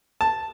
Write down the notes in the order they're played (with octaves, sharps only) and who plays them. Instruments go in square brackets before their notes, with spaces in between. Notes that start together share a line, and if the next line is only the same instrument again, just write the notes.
[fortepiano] A5